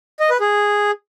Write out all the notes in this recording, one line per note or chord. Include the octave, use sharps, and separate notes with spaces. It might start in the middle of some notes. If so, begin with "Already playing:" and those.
D#5
B4
G#4